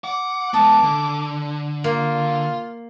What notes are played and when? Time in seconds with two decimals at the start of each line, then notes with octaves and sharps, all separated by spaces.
0.04 F#5 D6
0.54 G#3 B3 A5 D#6
0.83 D3
1.84 A#3 F4